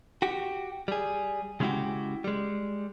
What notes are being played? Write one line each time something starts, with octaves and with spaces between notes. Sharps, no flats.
F#4 G4
G3 G#4
C#3 G#3 C#4 E4 F#4 G4
G3 G#3